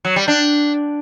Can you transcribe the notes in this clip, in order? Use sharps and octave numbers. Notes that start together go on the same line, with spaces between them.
F#3
G3
D4